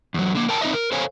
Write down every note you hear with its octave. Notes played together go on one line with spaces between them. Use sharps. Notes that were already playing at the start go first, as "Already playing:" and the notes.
E2 F#3
D3 A#3
A#4 G5 A5
C4 D#4 F#4 C5 D#5 E5
A#4
A4 C5 C#5 F5 G#5